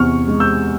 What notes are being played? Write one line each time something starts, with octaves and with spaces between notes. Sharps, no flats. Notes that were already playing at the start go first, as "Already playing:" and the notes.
Already playing: E2 C3 C#6 F6
G#3
E6 G6